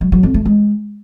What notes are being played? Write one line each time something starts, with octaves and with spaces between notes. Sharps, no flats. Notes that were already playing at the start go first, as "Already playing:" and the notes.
F#3
F#3
F2
A3
G#3